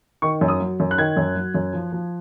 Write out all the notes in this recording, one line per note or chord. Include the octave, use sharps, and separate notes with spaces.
D#3 C#6
F#2
D#6
F#3
F#2
F#6
D#3 G#6
F#2
F#3
F#2
F3
F3